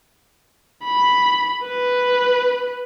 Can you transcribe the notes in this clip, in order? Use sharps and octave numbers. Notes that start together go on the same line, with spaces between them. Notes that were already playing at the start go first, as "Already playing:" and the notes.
B5
B4